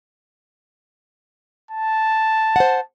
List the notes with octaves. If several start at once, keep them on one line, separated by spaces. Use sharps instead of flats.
A5
C5 F#5